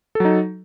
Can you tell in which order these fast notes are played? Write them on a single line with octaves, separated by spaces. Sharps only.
A4 F#3 D#4